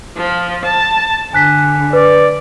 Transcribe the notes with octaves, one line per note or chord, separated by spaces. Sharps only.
F3
A5
D3 G#5 F#6 B6
B4 D5